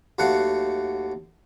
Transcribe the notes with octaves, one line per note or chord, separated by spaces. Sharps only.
D#2 F#3 A3 F5 F#5